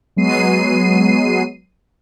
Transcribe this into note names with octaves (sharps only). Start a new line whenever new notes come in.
F#3 G#3 B3 C7 D#7